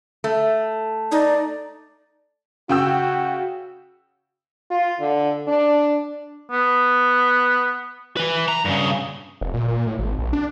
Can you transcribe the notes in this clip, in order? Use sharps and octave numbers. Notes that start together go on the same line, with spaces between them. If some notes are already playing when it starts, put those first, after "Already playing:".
A3
D#4 D5
C#3 F#4 G5 E6
F4
D3
D4
B3
E3 B4
A#5
G2 C#3
F1
A#2
A#2
A2
G#1
A#1
D4